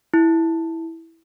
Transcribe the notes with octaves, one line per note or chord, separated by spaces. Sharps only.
E4